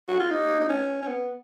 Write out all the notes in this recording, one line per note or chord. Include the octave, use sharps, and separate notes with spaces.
F#4
F4
D#4
D#4
C#4
C#4
B3